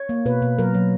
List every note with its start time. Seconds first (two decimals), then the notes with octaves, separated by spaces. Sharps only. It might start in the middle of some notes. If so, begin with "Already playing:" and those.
Already playing: C#5
0.09 A#3
0.25 B2 B4
0.42 B2
0.59 F#3 A#4
0.75 F#3